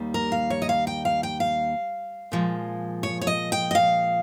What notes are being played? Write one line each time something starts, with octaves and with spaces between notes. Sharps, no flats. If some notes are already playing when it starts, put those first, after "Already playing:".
Already playing: D#2 D#3 G3 A#3
A#4
F5
C#5
D#5
F5
G5
F5
G5
F5
A#2 F3 G#3
C#5
C#5
D#5
G5
D#5
F5